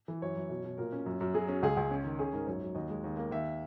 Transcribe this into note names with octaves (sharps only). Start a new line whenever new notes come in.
E3
F#2 C#5
F#2
B2
B2
A#2 A#4
C#4
F#2
F#2
F#3 G#4
C#4
C#2 G#4
C#2
C#4
D#3
C#4 G#4
G#2 A#4
F#2 C#5
F#3
D#2 D#5
G#3
D#2
A#3
D#2 E5